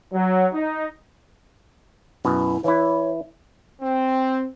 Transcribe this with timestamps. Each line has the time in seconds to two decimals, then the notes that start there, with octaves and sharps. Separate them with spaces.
0.13 F#3
0.53 D#4
2.25 F#2 B2 E4
2.64 E3 E4 C#5
3.82 C4